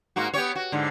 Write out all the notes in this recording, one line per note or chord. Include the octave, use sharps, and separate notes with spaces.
G#2 A#3 F#4
B3 G4 C#5
F#4
G#2 D3